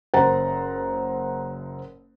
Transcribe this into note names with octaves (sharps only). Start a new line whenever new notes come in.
F#1 C5 F#5 A#5 A6